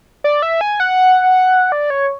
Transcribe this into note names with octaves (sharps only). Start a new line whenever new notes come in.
D5
E5
G#5
F#5
D5
C#5